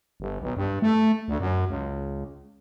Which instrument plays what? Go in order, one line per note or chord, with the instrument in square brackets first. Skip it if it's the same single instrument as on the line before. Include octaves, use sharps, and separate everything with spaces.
[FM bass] G1
B1
G2
A3
D2
F#2
C#2